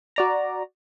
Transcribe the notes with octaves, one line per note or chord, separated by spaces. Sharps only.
F#4 D5 A#5